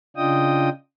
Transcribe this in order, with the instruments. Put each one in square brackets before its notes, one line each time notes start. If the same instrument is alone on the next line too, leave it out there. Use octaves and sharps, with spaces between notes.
[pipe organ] C#3 D4 F4 D#5 G5 D#6